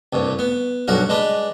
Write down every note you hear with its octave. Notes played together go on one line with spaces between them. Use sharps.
C2 G2
B3
B1 G2 F#4 A#4
G#3 D4 B4